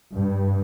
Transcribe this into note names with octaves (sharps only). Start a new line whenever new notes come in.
G2